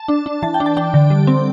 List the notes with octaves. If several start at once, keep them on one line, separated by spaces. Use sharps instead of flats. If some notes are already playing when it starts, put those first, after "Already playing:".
Already playing: A5
D4
D4
E3 A5
G5
D4
A5
D4 G5
D3
G3
C4